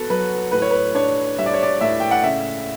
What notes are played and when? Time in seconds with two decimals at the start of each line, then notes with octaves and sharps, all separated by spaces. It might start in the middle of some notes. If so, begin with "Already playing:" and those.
Already playing: B3 F#4 A4
0.10 F#3 B4
0.52 A2 B4
0.62 C#5
0.71 B4
0.95 D4 C#5
1.39 G3 E5
1.46 D5
1.54 C#5
1.63 D5
1.81 A2 E5
2.00 G5
2.11 F#5
2.24 C#3 E5